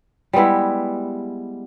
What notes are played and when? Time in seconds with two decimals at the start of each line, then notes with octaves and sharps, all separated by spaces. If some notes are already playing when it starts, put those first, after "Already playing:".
0.33 G3 G#3 B3 E4